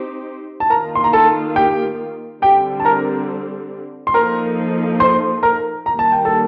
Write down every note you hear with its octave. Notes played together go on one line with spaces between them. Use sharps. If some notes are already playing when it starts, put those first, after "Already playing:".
Already playing: C4 D#4 G4 C5
A5
D#3 A#3 F4 A#4 A#5
C6
A#5
A4 A5
G4 G5
D3 G3 C4 G4 G5
A5
A#4 A#5
C6
F3 A#3 D#4 A4 A#4 A#5
C5 C6
A#4 A#5
D#3 G3 A#3 A#5
A5
G5
A4 A5